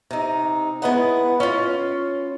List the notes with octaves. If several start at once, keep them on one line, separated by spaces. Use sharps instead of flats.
C3 D#4
G#3 B3 E4 B4 D#5 F#5
C#4 F4